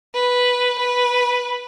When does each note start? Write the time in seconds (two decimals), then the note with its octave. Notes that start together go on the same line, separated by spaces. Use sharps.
0.14 B4
0.79 B4